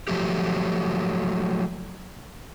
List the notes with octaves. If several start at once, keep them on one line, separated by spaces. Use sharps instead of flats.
F3 F#3 A3 G4